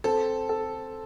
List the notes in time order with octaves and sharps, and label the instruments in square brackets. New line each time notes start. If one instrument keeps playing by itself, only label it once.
[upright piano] C4 [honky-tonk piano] A4
[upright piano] A4